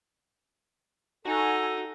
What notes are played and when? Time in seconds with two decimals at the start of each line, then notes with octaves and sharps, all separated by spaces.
1.25 D#4 F#4 A4 G#5